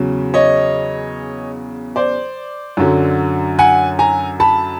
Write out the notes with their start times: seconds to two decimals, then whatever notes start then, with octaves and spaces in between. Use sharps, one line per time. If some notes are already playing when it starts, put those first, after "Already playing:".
Already playing: E2 C#3 F#3
0.34 C#5 D#5
1.96 C5 D5
2.77 F#2 D3 F#3
3.59 F#5 G#5
3.99 G#5 A#5
4.40 A5 B5